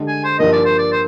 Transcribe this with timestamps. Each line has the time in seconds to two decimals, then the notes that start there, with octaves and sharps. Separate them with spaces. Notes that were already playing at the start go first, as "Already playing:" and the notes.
Already playing: D3 G#3 D4 G4
0.08 G#5
0.24 C5
0.39 G2 F3 A#3 D#5
0.53 D5
0.65 C5
0.78 D5
0.92 C5